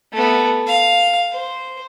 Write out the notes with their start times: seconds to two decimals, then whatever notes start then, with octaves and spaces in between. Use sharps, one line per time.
0.12 A3 B3
0.67 F5
1.32 C5